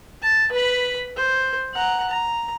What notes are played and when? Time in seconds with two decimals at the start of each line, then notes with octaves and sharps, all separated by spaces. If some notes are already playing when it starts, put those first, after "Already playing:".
0.22 A5
0.52 B4 B5
1.16 C5
1.74 F#5 A#5
2.09 A#5